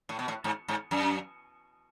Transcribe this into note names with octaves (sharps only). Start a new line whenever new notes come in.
A2
B2
A2
G#2
G#2
F#2